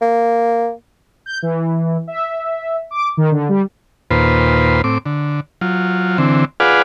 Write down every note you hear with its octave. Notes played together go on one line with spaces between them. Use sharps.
A#3
G6
E3
E5
D6
D#3
D3
G3
D#2 A#2 F4 B4 C5
A2 C4 D6
D3
F#3 F4
D3 E3 C4
F4 G#4 B4 D5 F5 F#5